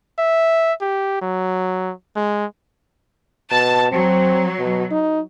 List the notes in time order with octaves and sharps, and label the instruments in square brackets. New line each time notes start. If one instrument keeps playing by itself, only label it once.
[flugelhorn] E5
G4
F#3
G#3
[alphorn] B2 [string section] A5
[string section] F#3 [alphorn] C4
[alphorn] B2
D#4